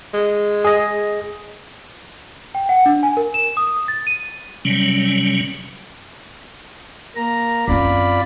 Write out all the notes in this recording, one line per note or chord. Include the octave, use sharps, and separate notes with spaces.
G#3
G#4 D#5
G5
F#5
D4
G#5
A#4
E7
D#6
A6
D#7
C3 F#3 G3 C#4
A#3 A#5
F#2 C4 F4 D5 B5